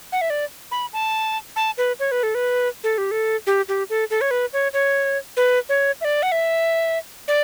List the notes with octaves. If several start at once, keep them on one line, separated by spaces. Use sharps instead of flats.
F#5
E5
D5
B5
A5
A5
B4
C#5
B4
A4
B4
A4
G4
A4
G4
G4
A4
A4
C#5
B4
C#5
C#5
B4
C#5
E5
D5
F#5
E5
D5